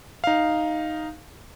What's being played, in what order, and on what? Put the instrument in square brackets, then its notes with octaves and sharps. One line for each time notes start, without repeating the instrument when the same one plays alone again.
[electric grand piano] D#4 F5